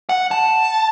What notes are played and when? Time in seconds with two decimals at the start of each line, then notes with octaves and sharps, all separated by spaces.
0.09 F#5
0.31 A5